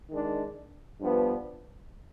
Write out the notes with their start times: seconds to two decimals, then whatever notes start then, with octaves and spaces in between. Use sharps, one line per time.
0.10 D#3 G#3 D4
1.01 G2 F3 B3 D4